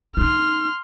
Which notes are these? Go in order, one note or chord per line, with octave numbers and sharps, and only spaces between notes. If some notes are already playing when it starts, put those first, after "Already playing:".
D#4 F4 C6 F6